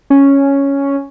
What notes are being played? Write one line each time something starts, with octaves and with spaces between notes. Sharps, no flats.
C#4